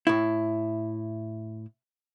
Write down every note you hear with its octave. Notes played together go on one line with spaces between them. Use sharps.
A2 E4